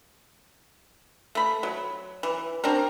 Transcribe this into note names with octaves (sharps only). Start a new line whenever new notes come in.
A3 B5
F#3
E3
C4 D4 F#4 A#4